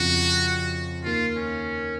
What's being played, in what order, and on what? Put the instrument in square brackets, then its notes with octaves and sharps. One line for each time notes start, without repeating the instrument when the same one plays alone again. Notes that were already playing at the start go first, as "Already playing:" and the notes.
Already playing: [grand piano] F2 C#3 F3 [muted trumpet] F#4
[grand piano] D#2 D#3 A#3 [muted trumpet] F4
[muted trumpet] C#4